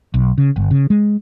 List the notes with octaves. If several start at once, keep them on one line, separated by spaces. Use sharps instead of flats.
B1
C#3
G1
C#3
G#3